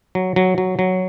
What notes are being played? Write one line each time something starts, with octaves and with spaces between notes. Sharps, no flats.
F#3
F#3
F#3
F#3